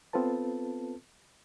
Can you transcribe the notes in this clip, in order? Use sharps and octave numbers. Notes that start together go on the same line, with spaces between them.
B3 C4 F4 A4 B4 A5